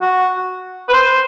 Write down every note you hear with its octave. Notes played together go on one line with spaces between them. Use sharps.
F#4
B4
C5